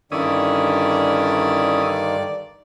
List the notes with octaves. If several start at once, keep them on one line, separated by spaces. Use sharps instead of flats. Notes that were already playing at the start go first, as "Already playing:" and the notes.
G2 D3 D#3 C#4 E4 D5 D#6